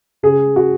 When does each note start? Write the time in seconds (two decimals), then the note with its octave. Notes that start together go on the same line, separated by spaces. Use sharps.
0.23 C#3 G#4
0.56 F#4